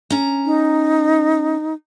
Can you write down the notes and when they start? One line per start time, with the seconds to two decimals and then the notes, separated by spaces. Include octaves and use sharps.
0.10 C#4 A#5
0.46 D#4